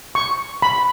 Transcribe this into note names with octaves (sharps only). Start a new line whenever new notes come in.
C#6
B5